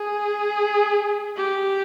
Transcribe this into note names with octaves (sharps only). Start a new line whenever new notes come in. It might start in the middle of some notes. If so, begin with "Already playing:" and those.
Already playing: G#4
G4